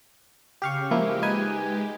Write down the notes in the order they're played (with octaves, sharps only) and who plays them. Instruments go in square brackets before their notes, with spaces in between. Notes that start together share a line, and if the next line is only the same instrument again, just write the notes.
[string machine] C#3 [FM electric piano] G4 F5 C#6
[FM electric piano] F3 A#3 E4 [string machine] G#3 G4
[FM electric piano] D#4 B4 G#5